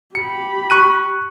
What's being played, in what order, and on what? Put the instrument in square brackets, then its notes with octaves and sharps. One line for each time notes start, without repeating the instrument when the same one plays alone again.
[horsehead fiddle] G4 B5 [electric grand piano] C#7
[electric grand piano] C#6 F#6 D#7